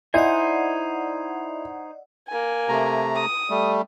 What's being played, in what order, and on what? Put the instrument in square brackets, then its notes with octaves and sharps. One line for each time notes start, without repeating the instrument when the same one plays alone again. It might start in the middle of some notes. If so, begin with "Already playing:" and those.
[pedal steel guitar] D#4 C5 G#5 [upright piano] E4 [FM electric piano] D5 D#5 F#5
[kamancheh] A#3 G#5
[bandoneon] C3 A3 A#5
[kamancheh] D#6
[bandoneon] G3 A3